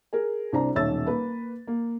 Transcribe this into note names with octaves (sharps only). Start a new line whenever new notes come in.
G#4 A#4
C2 D4 C5 A#5
D#1 B1 C#5 E5 E6 A6
A#3 B4 B5
A#3